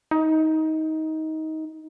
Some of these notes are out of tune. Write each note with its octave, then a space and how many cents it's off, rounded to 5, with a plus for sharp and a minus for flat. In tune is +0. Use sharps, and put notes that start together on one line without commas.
D#4 +20